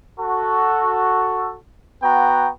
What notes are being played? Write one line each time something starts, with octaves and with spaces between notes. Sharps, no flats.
F#4 A4
B3 F#4 F#5 G5 A#5